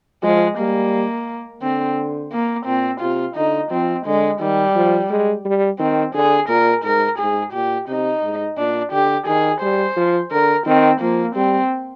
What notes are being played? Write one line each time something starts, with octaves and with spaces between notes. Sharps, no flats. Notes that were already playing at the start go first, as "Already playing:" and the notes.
F3 G#3
G3 A#3
D3 C4
A#3
A#2 C4
C3 F4
D3 D#4
F3 C4
D3 G#3
D#3 G3
F3
G#3
G3
D#3 C4
D3 G#4
A#2 A#4
G#2 A#4
G#2 G#4
A#2 G4
C3 D#4
G#2
A#2 D4
D3 G4
D#3 G#4
G3 C5
F3
D3 A#4
D#3 C4
F3 A#3
G3 C4